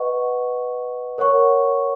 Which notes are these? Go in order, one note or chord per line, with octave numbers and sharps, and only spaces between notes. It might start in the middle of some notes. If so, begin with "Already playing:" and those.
Already playing: B4 D#5 F#5 C#6
A#4 C#5 F#5 C#6